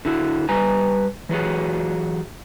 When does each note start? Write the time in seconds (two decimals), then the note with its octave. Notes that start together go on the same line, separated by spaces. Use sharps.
0.05 D3 E4 F#4
0.49 G3 B4 G#5 A#5
1.29 E3 F#3 F#4 G#4